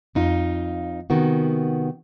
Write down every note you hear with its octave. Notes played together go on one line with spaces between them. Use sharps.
F2 D#4 F4
C3 D#3 B3 F#4